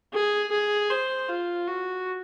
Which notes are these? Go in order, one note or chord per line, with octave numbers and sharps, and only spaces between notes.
G#4
G#4
C5
F4
F#4